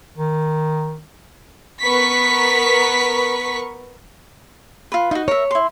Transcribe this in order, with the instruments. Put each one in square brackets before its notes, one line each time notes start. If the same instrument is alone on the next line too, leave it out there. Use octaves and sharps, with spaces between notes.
[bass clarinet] D#3
[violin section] B3 A#4 B4 C#6 B6
[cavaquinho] F4 B4
[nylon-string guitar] D#4 [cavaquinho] F4 F#4
[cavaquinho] A#4 E5 [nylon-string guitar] C#5
[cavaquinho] E4 C6